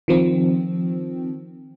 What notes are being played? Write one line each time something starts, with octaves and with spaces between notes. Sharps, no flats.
D#3 F3 C4